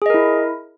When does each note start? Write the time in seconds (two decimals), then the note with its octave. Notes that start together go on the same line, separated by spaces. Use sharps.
0.02 G#4
0.06 D#5
0.10 A#4
0.14 E4